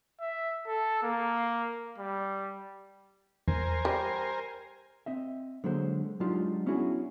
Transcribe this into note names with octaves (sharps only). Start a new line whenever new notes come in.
E5
A4
A#3
G3
E2 A#4 C5 G#5
G3
C4 D#5 E5
D3 F#3 G#3 A#3 C5
F#3 G#3 D4 D#4 F4 G4
B3 C#4 D4 E4 F#4 G#4